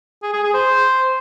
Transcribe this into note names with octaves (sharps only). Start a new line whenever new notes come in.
G#4
G#4
G#4
C5